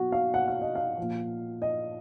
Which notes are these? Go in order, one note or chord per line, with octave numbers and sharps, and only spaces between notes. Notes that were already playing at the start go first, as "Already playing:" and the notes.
Already playing: B2 F#3 F#4
F5
F#5
F5
D#5
F5
A#2 F3
D#5